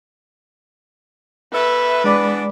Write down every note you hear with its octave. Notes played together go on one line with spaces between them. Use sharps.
B2 A4 B4 E5
E3 G#3 B3 D4 D5 D6